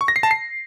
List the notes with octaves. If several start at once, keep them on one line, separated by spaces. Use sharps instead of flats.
C#6
A#6
C7
A5
C7